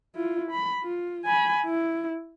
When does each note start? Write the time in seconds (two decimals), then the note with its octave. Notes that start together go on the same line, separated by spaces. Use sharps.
0.15 E4 F4
0.51 B5
0.83 F4
1.25 G#5 B5
1.66 E4